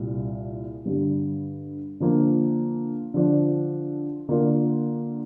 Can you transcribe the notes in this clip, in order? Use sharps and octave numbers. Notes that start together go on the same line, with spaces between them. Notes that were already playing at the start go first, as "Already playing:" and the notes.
Already playing: C2 A#2 G3
G2 D3 G3
D3 F3 A#3
D3 F3 D4
D3 A#3 D4 F4 A#4